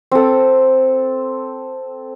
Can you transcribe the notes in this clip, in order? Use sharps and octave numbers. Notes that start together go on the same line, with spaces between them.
C4 A4